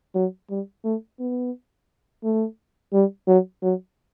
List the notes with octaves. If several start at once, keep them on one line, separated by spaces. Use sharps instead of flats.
F#3
G3
A3
B3
A3
G3
F#3
F#3